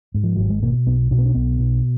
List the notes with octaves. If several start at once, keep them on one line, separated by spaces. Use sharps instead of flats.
G#2
F3
G#1 F#3
G#3
B2 A#3
B1 B3
B2 D4
B3
D4
B1 B3
B2